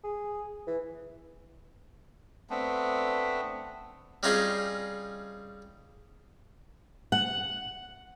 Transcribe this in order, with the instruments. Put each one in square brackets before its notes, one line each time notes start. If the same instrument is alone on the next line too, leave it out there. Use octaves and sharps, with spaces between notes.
[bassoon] G#4
E3
[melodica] A3 B3 C4 D4
[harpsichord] G3 C4 C#4 D#4 F4 G#4
[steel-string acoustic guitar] F#5